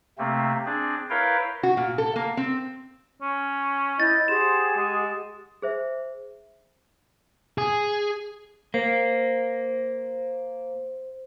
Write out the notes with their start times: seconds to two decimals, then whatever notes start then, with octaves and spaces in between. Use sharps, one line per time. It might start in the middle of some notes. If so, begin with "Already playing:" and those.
0.18 C3 A3 A#3 C4
0.66 C4 D4 G#4 D5
1.10 E4 A#4 B4 C#5 F5 G5
1.63 F#4
1.77 A#2
1.98 A4
2.16 A#3
2.37 C4
3.22 C#4
4.00 E4 D#5 G6 A6
4.28 G4 G#4 C5 F#5 E7
4.77 G#3
5.62 G#4 C5 E5
7.58 G#4
8.74 A#3 C5